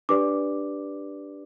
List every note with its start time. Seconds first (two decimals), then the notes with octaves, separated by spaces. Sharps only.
0.09 D4 G4 B4 D5 D6